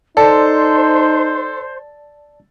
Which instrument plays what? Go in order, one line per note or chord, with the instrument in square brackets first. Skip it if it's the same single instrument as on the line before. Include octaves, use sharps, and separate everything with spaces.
[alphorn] D#4 [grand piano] A4 [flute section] C5 [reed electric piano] D5 A5